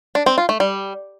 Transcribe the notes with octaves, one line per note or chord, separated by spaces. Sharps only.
D4
C4
F4
A3
G3